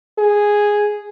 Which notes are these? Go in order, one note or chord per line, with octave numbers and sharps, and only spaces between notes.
G#4